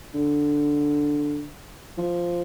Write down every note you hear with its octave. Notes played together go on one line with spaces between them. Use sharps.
D3
F3